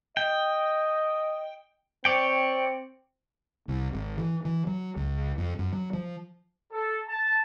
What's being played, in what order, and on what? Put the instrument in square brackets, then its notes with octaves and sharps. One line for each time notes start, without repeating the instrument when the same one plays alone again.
[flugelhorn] D#5 [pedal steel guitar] G5
[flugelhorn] C4 [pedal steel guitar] C#5 D5 G5
[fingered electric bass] C2
G#1
E3
E3
F#3
C#2
F2
F#2
F#3
F3
[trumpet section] A4
A5